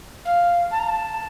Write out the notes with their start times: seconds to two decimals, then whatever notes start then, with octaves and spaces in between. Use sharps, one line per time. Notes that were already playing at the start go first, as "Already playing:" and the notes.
0.25 F5
0.70 A5
0.79 A#5
0.88 A5